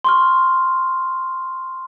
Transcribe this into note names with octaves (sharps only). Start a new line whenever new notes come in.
C6 C#6 F6